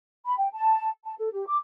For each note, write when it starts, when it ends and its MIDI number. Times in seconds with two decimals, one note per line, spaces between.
0.25 0.35 83
0.38 0.49 79
0.53 0.88 81
1.04 1.13 81
1.18 1.31 69
1.32 1.46 67
1.47 1.57 86